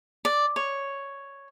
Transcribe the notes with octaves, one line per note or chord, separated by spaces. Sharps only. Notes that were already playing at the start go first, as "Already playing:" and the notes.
D5
C#5